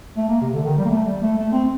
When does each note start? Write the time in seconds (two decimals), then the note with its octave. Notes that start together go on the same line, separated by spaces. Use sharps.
0.17 A3
0.29 A#3
0.41 C3
0.53 D3
0.65 D#3
0.78 G3
0.85 A#3
0.90 A3
1.05 G3
1.22 A3
1.38 A3
1.52 C4